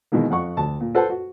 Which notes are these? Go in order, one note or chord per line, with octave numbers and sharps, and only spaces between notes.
B2 D#3 E3 G#3 A#3
F2 F#5 C#6
D2 A5
A#2
A4 B4 C5 F#5 A5
F#4